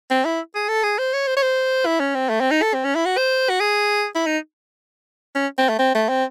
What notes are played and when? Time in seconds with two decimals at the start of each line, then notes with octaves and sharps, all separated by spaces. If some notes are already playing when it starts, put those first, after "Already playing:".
0.11 C4
0.25 E4
0.55 G#4
0.69 A4
0.84 G#4
0.98 C5
1.13 C#5
1.27 C5
1.36 C#5
1.43 C5
1.86 E4
2.00 C#4
2.15 C4
2.30 A3
2.41 C4
2.51 D#4
2.62 A4
2.74 C4
2.85 C#4
2.95 E4
3.06 F#4
3.17 C5
3.49 F#4
3.60 G#4
4.15 E4
4.26 D#4
5.35 C#4
5.58 C4
5.69 A3
5.79 C4
5.95 A3
6.09 C4